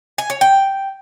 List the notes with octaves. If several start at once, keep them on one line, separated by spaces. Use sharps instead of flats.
G#5
C#5
G5